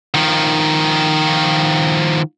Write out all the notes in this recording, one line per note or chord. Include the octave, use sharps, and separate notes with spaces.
D#3 F3